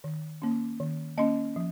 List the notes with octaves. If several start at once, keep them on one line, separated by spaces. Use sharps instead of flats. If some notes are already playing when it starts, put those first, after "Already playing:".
D#3
A#3 C#4
D#3
A#3 C#4 D#5
F3